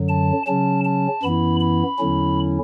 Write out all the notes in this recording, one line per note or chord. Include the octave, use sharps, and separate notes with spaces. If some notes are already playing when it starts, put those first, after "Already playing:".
Already playing: F#2 D3 F#3
A5
C#3 F#3 C#4 A5
A5
F#2 E3 B3 E4 B5
B5
E2 D3 F#3 C#4 E4